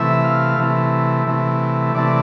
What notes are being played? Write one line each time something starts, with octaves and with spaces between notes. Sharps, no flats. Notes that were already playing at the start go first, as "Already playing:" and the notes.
Already playing: C3 E3 A3 E5
F5
C3 E3 A3
C3 E3 A3
C3 E3 A3 D5